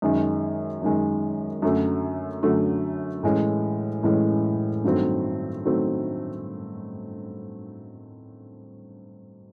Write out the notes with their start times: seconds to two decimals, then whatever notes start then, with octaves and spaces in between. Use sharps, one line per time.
0.02 F#2 D#3 G#3
0.82 F#2 D#3 G#3
1.62 F#2 D3 F#3 A3
2.43 F#2 D3 F#3 A3
3.23 A2 E3 G#3 C#4
4.03 A2 E3 G#3 C#4
4.84 G2 D#3 F#3 A3 C4
5.65 D#3 F#3 A3 C4